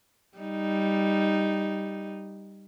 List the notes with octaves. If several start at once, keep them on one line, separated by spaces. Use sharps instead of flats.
G3 D#4